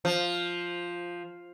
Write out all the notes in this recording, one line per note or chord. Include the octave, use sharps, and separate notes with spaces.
F3